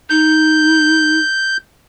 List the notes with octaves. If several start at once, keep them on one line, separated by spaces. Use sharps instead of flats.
D#4 G6